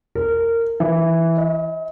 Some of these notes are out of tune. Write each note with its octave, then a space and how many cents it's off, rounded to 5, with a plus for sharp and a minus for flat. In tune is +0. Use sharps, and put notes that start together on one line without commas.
A#4 -20
E3 +0
D#5 +40